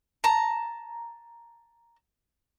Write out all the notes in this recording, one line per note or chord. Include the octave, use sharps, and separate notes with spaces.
A5 A#5